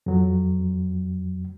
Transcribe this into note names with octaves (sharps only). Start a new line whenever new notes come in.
F2 F#3